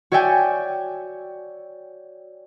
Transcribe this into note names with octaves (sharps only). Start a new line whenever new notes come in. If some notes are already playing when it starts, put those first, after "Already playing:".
F#4 C#5 D5 E5 G5 G#5